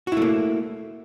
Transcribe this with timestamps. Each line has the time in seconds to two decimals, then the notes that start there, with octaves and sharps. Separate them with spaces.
0.07 F#4
0.12 E4
0.17 A3
0.22 A#3